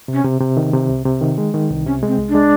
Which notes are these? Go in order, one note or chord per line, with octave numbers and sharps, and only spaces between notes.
C3
C#4
C3
C3
D#3
C3
C2
C3
D#3
G#3
D#3
C2
C3 C#4
G#3
C4
C2
D4
G#3